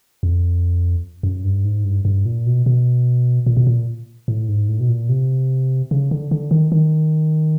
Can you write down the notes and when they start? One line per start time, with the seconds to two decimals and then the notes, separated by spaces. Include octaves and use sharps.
0.23 F2
1.23 F#2
1.44 G2
1.64 G#2
1.85 G2
2.05 G2
2.25 A#2
2.46 B2
2.66 B2
3.46 A#2
3.57 B2
3.67 A#2
4.28 A2
4.49 G#2
4.69 A2
4.80 B2
4.89 A#2
5.09 C3
5.91 C#3
6.11 D3
6.31 D3
6.51 D#3
6.72 D#3